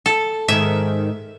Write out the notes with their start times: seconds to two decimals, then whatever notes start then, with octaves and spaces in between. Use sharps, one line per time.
0.06 A4
0.48 G#2 D#3 E5